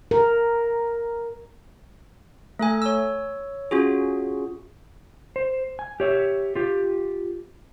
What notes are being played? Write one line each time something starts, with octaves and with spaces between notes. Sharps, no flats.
A#4
A3 A4 G#5
C#5 E6
C#4 F4 F#4 G#4
C5
G#5
G4 C#5 E5
F4 G4